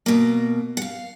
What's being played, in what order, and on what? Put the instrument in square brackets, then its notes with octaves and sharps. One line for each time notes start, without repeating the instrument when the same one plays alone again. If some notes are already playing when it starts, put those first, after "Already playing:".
[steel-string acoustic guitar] B2 A#3
F#5
F5